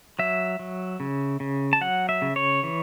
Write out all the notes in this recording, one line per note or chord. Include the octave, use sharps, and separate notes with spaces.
F#3 E5
F#3
C#3
C#3
A5
F#3 F#5
E5
C#3
C#5
E3